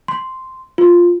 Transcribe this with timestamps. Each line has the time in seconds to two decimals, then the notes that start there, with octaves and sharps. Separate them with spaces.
0.08 C6
0.78 F4